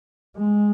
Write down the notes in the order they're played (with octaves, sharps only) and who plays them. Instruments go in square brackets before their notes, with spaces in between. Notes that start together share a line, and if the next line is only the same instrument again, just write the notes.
[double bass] G#3